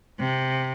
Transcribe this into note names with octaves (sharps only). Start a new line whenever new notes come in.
C3